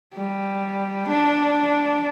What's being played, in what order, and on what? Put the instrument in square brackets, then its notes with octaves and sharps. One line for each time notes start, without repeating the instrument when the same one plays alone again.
[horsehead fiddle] G3
D4